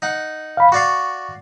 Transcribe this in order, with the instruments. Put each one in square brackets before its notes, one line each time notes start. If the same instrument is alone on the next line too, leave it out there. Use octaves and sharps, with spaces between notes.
[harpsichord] D#4 F#5
[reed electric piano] F5 B5
[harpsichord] F#4 D5 F5 [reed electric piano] C#6